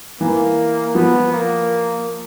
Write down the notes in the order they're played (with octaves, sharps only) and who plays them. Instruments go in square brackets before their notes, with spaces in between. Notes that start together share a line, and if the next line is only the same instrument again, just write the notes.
[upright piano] E3 [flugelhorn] A#3
[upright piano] F3 [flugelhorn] B3
[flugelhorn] A#3